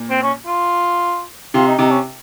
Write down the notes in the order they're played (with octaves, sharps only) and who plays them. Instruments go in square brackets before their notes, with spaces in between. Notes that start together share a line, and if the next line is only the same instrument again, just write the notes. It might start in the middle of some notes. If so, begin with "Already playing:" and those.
Already playing: [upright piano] A#2
[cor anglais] C4
C#4
F4
[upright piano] C3 [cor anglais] F4
[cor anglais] D#4
[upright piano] C3 [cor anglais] D#4
[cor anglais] C#4